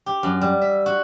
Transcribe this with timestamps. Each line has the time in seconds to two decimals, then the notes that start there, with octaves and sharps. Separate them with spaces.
0.06 G4
0.23 F#2
0.41 G3
0.61 E5
0.86 F#4